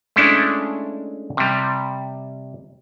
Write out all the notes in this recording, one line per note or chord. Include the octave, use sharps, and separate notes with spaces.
G#3 A3 C#4 D4 E4
C3 G3